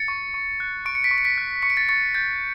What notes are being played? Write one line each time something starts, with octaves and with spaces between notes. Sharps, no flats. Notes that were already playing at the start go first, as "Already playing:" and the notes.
Already playing: A6 C#7
C#6
C#6
F#6
C#6 D7
C#7
B6 D7
C#6
C#7
B6 D7
F#6
C#6 C#7
D7
A6 C#7
C#6 A6 C#7
G6 A6